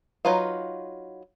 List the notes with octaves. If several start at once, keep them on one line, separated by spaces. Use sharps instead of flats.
F#3 D#4 F4 B4 F5